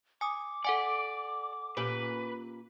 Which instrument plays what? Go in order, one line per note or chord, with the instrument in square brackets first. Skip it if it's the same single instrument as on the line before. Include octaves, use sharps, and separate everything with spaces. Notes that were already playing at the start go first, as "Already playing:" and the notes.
[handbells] G#5 D#6 [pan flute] D6
[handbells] A4 F#5 G#5 [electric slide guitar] D5
[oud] A#2 C#4 G4 [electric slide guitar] B4